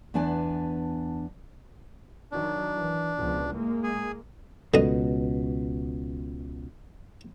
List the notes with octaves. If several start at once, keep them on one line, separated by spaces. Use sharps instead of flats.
E2 B3 D4 B4 G#5 A5
D#3 F#3 D4
E3
C#2 B2 F3
A2 G#3 A#3
G#4
C#2 B2 D3 D#5